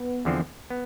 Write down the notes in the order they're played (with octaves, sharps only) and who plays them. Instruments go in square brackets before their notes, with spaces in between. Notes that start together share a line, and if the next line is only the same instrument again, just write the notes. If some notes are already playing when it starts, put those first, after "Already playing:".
Already playing: [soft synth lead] B3
[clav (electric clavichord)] E2 D3 F3 C4
B3